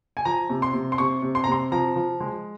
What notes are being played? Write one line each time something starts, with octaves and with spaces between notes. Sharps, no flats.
G#5
F3 A#5
C3
C6
C3
C6
C3 C#6
C3
C6
A#5
C3 C6
F3 A#5
F3
G#3